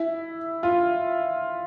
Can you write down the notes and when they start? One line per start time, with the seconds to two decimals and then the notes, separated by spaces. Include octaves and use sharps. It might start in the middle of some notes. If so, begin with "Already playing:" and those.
Already playing: E4
0.63 F4